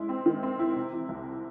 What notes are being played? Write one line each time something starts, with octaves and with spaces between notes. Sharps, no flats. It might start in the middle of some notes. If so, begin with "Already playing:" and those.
Already playing: G#3 C#4 E4
C4
D#3
C4
E4
C3
E3
C2